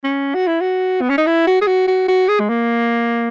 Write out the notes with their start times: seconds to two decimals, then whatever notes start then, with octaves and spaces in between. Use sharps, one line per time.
0.04 C#4
0.34 F#4
0.47 E4
0.61 F#4
1.01 B3
1.10 C#4
1.18 D#4
1.26 E4
1.47 F#4
1.61 G#4
1.67 F#4
1.87 F#4
2.08 F#4
2.28 G#4
2.40 G#3
2.49 A#3